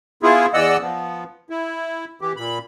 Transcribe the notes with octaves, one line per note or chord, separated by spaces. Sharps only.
B3 E4 F4 G#4
E2 E3 D5 D#5 F#5 E6
F3 B3
E4
E3 G4
A#2 B5